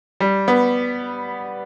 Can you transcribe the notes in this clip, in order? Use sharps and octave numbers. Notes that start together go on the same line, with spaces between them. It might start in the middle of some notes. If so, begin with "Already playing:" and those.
G3
B3